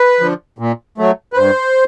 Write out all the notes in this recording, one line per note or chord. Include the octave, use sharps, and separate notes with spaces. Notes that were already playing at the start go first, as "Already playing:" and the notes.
Already playing: B4
D3 F3
A#2
F#3 A3
B4
G2 C5